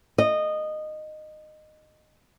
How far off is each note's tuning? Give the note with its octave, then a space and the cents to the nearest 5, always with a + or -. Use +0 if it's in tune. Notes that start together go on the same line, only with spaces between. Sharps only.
D#5 -15